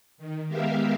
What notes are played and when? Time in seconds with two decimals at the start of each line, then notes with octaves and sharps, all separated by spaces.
0.18 D#3
0.48 G#3 B3 G4 A#4 E5 F5